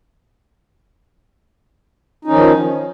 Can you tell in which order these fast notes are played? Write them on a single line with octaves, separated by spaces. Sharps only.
D#4 C#4 D#3 F3